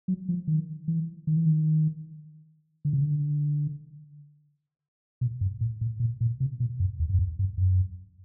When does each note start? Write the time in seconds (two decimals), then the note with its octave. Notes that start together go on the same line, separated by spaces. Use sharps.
0.08 F#3
0.29 F3
0.47 D#3
0.88 E3
1.27 D#3
1.36 E3
1.46 D#3
2.85 D3
2.93 C#3
3.01 D3
5.21 B2
5.41 G2
5.61 A2
5.81 A2
6.00 A#2
6.21 A#2
6.40 C3
6.60 B2
6.80 F#2
7.00 E2
7.10 F#2
7.19 F2
7.39 G2
7.58 F#2